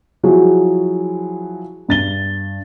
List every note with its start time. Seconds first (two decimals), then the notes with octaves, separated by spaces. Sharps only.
0.23 F3 F#3 E4 F#4 G#4
1.89 G2 A6 G7